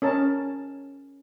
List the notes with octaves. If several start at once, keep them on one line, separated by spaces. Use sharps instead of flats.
C#4 A#4 A5